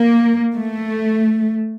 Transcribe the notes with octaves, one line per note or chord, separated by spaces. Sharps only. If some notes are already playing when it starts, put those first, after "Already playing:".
Already playing: A#3
A3